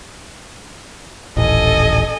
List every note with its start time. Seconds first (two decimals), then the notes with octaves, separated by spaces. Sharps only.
1.37 D#1 A1 A4 D#5 G#5